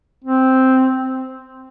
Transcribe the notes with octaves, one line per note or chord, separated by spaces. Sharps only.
C4